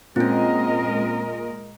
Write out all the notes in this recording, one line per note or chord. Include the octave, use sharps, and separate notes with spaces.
A#2 G#3 C4 C#4 A#4 D#5